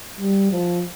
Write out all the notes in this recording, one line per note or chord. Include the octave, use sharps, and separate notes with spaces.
G3
F3